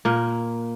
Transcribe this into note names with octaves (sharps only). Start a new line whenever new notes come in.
A#2 A#3